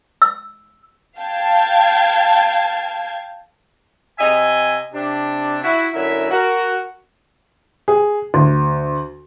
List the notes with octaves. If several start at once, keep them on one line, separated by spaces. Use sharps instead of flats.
E6
F5 G5 A5 G#6
C3 D#5 E5 G#5
C3 D4
E4 F#4
F#2 D3 F#3 E4 A#4 E5
F#4 A#4
G#4
D2